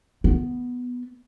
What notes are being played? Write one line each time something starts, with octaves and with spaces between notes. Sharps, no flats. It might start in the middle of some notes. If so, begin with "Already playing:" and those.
B3